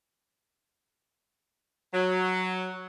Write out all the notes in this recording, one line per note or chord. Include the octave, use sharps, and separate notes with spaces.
F#3